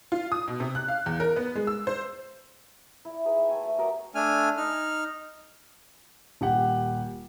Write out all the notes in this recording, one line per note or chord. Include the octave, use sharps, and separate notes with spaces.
F4
D#6
B2
C3
F#6
F5
E2
A#4
B3
G#3
E6
C5
E4 D5
D#4 G#4 B4
E5 G5
A3 G#5
A3 C#5 G#5
F#3 G4 A#4 D#5
A3 D4 G#5 F6
D#4 F6
D#1 G4 F#5